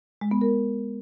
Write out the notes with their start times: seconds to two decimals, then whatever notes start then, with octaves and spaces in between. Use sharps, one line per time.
0.21 G#3
0.31 B3
0.41 A#4